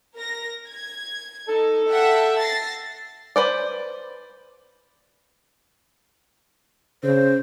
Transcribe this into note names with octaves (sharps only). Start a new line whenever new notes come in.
A#4 A#6
G#6
D#4 A4
E5 F#5 G5
A6 A#6 C7
B4 C5 D5
C#3 C5